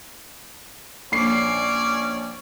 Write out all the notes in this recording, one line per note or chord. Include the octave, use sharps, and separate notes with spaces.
A#1 C#4 C#5 D5 C7